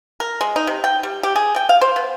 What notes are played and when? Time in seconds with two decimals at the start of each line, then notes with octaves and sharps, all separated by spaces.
0.20 A#4
0.41 G#3
0.56 D#4
0.67 C3
0.84 G5
1.03 G3
1.23 G4
1.36 G#4
1.56 G5
1.69 F5
1.81 C5
1.96 B3